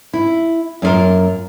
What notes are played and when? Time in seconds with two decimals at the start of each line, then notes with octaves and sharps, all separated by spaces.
0.13 E4
0.82 F#2 A#3 C4 F4 A#4